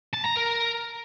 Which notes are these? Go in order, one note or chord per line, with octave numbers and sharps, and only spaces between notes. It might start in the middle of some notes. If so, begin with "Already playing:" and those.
A5
A#5
A#4